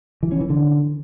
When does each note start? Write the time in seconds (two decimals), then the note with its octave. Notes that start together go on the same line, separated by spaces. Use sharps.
0.23 E3
0.32 C#4
0.41 E3
0.50 D3